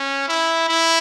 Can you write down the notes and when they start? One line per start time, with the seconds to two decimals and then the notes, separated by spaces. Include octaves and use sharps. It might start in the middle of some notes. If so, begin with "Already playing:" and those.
Already playing: C#4
0.28 E4
0.68 E4